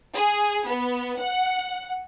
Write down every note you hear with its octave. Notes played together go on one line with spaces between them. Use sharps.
G#4
B3
F#5